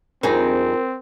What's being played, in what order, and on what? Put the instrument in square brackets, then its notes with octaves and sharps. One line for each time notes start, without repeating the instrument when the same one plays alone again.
[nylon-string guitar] F2 G3 D4 [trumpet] C4 [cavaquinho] D#4 G#4 A#5 [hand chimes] A#4